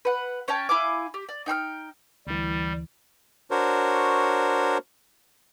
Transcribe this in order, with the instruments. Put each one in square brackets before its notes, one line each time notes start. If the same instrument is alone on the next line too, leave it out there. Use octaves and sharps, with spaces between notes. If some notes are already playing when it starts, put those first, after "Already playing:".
[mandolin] B4 F#5
C#4 C#5 G5 A5
E4 F5 G#5 D6
G4
D5
D#4 G5 C6 F6
[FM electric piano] D2 E3 [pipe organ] G3
[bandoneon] D4 F#4 A#4 C5 C#5